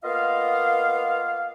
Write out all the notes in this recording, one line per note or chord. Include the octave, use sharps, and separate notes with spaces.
A#3 B3 F4 D#5 F5